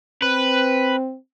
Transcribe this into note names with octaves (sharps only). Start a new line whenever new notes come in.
C4 B4